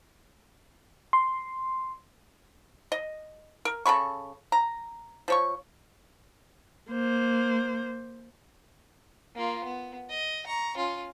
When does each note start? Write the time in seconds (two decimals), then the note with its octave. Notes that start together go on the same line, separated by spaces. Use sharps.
1.13 C6
2.92 D#5
3.65 A#4
3.86 C#3 A4 B5 C#6
4.52 A#5
5.28 F3 C#5 C#6
6.91 A#3 C5
9.35 A#3 F4
9.64 B3
10.10 D#5
10.47 A#5 C#6
10.77 C#4 F4